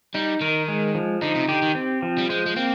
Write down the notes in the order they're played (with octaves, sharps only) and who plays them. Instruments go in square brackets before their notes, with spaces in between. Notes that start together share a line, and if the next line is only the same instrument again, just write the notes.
[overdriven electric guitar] G3 [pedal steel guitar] D#4
[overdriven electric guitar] D#3 [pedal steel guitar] A#4
[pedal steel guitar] G#3
F3
[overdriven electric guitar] D3 [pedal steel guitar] D#4
[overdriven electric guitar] C3
[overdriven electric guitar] D3 [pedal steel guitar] G4
[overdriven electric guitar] D#3
[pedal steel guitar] C4
F3
[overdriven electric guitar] G3
[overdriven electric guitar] G#3 [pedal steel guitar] C5
[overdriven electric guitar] G#3
[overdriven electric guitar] A#3 [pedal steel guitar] C4